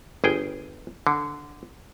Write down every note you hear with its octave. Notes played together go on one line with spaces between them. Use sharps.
G1 G#4 G5
D3